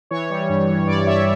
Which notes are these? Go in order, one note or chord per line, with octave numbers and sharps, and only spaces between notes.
E3 C#5
G3
G2
E3
G2 D5
G2 C#5 E5